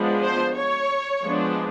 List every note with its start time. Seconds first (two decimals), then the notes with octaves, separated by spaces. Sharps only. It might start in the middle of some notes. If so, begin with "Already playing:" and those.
Already playing: F3 G#3 B3 D4
0.23 C5
0.56 C#5
1.24 F3 G#3 B3 D4